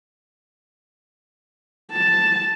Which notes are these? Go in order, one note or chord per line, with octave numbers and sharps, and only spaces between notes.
A5